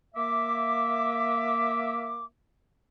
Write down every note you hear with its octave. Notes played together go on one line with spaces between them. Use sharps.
A#3 E5 D6